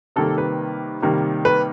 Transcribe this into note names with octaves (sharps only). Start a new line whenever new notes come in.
C3 D#3 G3 A#3 A4
B4
C3 D#3 G3 A#3
B4